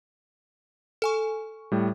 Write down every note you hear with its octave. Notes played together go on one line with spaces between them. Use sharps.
A4 G#5 C#6
A2 G3